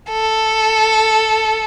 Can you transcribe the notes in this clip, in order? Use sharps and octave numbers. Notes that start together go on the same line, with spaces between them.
A4